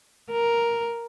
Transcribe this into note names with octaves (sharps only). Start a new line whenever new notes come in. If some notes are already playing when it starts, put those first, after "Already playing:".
A#4